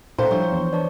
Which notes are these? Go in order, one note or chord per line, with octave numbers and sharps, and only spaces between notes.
A#2 D4 E4 A4 C5 F5 G5 A#5
F3 G3 D4 E4 F4 C#5 C#6
E2
D4 B4 C#5 D5 A5 C#6